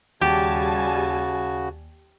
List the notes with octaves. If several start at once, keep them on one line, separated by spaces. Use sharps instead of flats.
D#2 C#3 G3 F#4 G4 G#5 A5